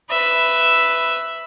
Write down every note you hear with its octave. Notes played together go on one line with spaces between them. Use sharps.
B4 E5